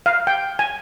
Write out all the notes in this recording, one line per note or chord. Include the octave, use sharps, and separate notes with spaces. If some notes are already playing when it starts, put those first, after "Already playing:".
F5
G5
G#5